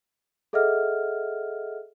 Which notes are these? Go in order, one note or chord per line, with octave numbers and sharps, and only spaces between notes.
G#4 A4 D#5 E5 F#5 F6